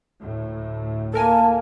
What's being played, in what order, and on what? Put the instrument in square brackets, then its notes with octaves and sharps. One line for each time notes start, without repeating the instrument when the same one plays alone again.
[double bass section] D2 A2
[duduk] A#3 [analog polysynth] A4 A#4 G#5 [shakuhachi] A5